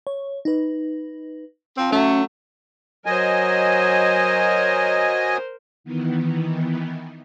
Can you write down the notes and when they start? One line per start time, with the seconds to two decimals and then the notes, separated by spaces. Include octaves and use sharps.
0.07 C#5
0.45 D#4 B4
1.78 F3 C4
1.93 F#3 A3 C#4
3.06 F#3 A#4 C5 D#5 G#5
5.84 D#3 E3 B3